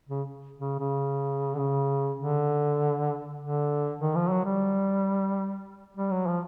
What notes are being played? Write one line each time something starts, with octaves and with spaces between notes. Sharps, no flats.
C#3
C#3
C#3
D3
C#3
D3
D3
D#3
F3
F#3
G3
G3
F#3
F3